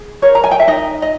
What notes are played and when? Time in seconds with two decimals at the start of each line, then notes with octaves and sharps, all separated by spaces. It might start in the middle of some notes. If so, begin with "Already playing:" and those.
Already playing: G#4
0.22 A#4 C#5
0.35 A#5
0.44 G#5
0.51 G5
0.60 E5
0.67 D#4 D#5
1.02 D#5